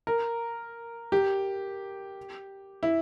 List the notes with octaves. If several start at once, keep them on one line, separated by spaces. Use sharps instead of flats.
A#4
G4
E4